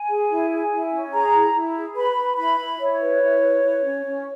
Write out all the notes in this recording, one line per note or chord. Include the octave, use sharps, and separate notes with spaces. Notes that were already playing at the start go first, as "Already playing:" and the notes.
Already playing: G#5
G#4
E4
G#4
E4
C#4
G#4 A#5
E4
E4
G#4
B4 B5
B4
E4 B5
E4
E4 C#5
B4
E4
B4
E4
C#4
C#4